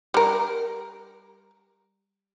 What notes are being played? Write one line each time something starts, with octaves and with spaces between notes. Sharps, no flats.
G3 A#4